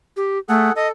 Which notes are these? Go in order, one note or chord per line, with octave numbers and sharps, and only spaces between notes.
G4
A3 G#4 A4 F#5
A4 D#5